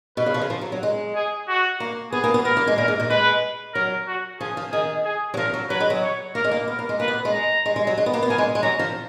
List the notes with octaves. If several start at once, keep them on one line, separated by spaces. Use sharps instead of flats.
B2 B4
C#3
F3
C#3
F3
F#3
F#3
G#3
G#4
F#4
A#3
B3 G#4
A#3
B3
B3 A#4
A#3
G#3
A#2 A#4
G#2
A#2
G#3 B4
F#3 A#4
F#4
F3 G#4
F3
D#3 G#4
G#4
F#3
F3 A#4
F#3
F#3 B4
G#3
F#3
C#5
A#3 A#4
G#3
A#3
B3 A#4
A#3
G#3
A#3 B4
B3
G#3
A#5
G#3
G#3
F#3
G#3
B3
A#3
B3
A#3 G#5
G#3
G#3
F#3 A#5
F3